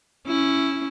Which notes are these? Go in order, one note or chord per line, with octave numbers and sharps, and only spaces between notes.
C#4 E4